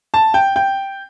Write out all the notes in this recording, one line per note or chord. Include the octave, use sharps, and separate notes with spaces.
A5
G5
G5